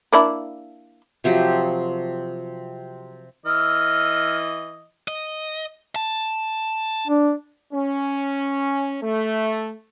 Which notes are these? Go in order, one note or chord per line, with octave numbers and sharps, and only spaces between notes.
A#3 D4 E4
C3 F3 F#3 G4
E3 D#5 E6 F6
D#5
A5
D4
C#4
A3